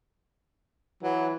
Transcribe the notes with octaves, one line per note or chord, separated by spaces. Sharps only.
E3 F#3